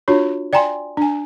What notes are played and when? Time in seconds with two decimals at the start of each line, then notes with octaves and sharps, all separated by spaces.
0.08 D4 F4 F#4 C#5
0.53 D5 G5 G#5 A#5 C6
0.97 D4 G#5